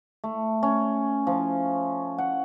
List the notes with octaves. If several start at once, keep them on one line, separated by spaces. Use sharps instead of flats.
A3
C#4
F3
F#5